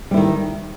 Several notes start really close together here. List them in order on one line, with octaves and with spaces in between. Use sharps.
G3 E4 D#3